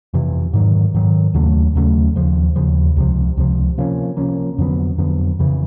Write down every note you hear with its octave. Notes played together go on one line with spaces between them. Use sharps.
F2 C3 E3
G#2 D#3 F#3
G#2 D#3 F#3
D#2 C#3 F#3 A3
D#2 C#3 F#3 A3
D#2 C#3 F3
D#2 C#3 F3
C#2 C3 F3
C#2 C3 F3
C3 F3 A#3 C#4
C3 F3 A#3 C#4
F2 D3 F#3 B3
F2 D3 F#3 B3
F2 C#3 E3